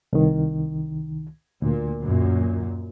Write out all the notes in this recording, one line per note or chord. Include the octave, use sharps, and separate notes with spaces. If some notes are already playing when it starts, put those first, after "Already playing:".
C2 D#3
D2 A#2
F#2 A#2